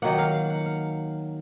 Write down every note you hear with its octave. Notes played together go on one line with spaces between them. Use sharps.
D#3 F#3 A#3 F#5
F5
F5
F#5
F5